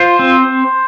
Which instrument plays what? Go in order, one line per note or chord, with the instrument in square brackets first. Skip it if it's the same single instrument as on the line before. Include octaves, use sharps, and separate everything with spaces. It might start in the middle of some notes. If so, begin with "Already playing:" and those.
Already playing: [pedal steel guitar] F4 [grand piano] C5
[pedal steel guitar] C4